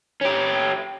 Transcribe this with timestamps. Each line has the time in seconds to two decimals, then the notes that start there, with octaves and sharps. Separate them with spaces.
0.21 C#4 G4